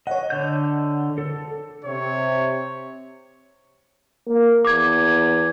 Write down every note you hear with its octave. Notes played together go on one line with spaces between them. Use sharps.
C#5 D#5 F#5
D3 G6
A4
C3 C#5
A#3
E2 D6 G#6